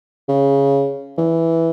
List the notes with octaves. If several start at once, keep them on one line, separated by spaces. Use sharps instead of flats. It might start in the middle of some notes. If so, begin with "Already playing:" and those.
C#3
E3